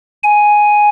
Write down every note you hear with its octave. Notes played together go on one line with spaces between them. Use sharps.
G#5